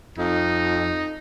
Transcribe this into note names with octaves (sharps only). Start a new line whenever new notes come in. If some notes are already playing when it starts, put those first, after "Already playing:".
F2 D#4